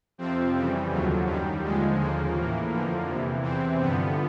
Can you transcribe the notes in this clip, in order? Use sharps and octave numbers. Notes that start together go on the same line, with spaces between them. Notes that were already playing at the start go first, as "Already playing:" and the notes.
F2 C3 F3 C4
F2 C#3 E3 G3
D#2 D3 F3 F#3
F#2 D#3 G3
D#2 D3 F3 G#3
D#2 C#3 F3 A#3
A2 E3
F2 D3 F3
E2 C3 E3
E2 C3 E3 C4
G2 D3 F3 B3